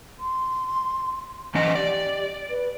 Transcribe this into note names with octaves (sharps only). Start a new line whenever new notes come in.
C6
E3 C#4 D#5
G4 D5
B4